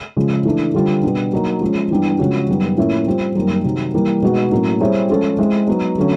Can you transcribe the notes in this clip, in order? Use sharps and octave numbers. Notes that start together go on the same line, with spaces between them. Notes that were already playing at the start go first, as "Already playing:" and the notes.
C#3 F3 G#3
E3 A3 D4
D3 G3 C4 F4
B2 G3 B3 D4
F#3 A#3 D#4
F3 G#3 C#4
G2 E3 G3 B3 D4
C#3 F3 G#3 C#4 F#4
F#2 D#3 G3 B3
A2 F3 A#3 C#4 E4
G3 C4 F4
F#2 D#3 G3 A#3
C3 D#3 F#3
E3 G3 A#3
B2 G#3 B3 D#4 F#4
A2 F#3 A#3 C#4
G3 C4 E4 G#4 C#5
F3 G#3 C#4 F4 A4
G#3 C4 E4
F#3 B3 D#4
D3 F#3 A3 C#4